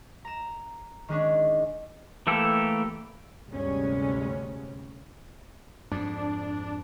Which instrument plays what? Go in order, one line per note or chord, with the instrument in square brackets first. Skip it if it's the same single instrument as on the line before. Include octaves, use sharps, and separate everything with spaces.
[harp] A#5 E7
D#3 G#3 C#4 D4
[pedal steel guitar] E3 A3 A#3 G4 A4
[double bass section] G1 D2 C3 G3 G#3 C#4
[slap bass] F2 G#2 [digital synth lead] D4